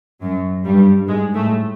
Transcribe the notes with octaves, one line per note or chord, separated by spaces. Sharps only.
F#2 F#3
G2 G3
G#2 G#3
A2 A3